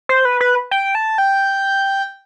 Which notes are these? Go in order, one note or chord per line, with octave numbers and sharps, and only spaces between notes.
C5
B4
B4
G5
A5
G5